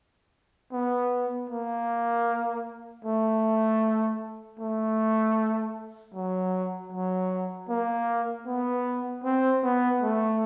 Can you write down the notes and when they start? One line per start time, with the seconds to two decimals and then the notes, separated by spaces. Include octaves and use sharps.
0.72 B3
1.49 A#3
3.04 A3
4.59 A3
6.14 F#3
6.92 F#3
7.69 A#3
8.46 B3
9.24 C4
9.63 B3
10.02 A3